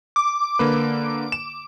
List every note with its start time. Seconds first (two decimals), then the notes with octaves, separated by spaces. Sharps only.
0.16 D6
0.59 D3 A#3 B4
1.32 E7